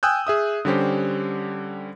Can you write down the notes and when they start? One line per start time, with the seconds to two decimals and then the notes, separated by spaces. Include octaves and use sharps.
0.03 G5 G#5 D#6 E6 F#6 G6
0.27 G#4 E5 D#6
0.65 D3 G3 C#4 G4 C5